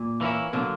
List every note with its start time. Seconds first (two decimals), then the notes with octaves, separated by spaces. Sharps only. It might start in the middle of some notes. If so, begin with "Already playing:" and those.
Already playing: A#2
0.21 E3 A#3 C#4 E4
0.53 B2 D3 F#3 A#3